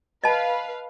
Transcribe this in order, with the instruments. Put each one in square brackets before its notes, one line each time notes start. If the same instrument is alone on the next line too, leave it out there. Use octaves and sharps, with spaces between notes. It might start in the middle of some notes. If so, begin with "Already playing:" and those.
[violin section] B4 F5 [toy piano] D#5 A5